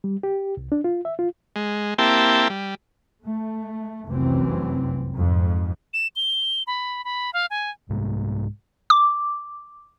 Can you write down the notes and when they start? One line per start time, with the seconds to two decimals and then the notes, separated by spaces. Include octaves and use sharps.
0.04 G3
0.23 G4
0.57 C2
0.72 D4
0.84 F4
1.05 E5
1.19 F4
1.56 G#3
1.98 A#3 C4 E4 G4 G5 A5
2.50 G3
3.24 A3
4.08 F1 C2 F#2 E3 C4
5.16 F2 G#2
5.93 E7
6.16 G7
6.67 B5
7.05 B5
7.33 F5
7.50 G#5
7.89 C2 G#2 C3 G#3
8.90 D6